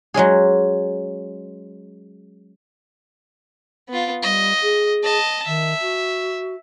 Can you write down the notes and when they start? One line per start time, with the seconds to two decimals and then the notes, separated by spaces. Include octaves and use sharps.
0.14 F#3 G#3 C#4 G#4
3.89 B3 F4
4.23 G3 D#5
4.62 G#4
5.04 D#5 A5
5.47 D#3 E5
5.81 F#4